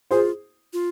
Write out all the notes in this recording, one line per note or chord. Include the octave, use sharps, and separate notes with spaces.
F4 G#4 C5
F4